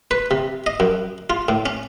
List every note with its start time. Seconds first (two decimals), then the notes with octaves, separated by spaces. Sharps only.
0.11 B4
0.31 C3
0.66 D#5
0.80 F#2
1.30 F4
1.48 A2
1.66 C#4